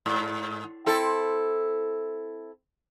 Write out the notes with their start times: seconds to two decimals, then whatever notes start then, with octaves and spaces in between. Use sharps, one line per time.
0.06 G#2
0.86 C4 E4 A4